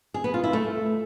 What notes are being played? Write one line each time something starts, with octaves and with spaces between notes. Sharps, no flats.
G#4
B3
F4
E4
A3